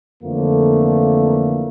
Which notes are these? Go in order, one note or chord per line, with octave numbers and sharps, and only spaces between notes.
F2 D3 E3 A3 A#3